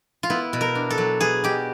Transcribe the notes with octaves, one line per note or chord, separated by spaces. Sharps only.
F4
B3 E4
B2
A#4
D4
A4
F#3
B3 G#4
B2 G4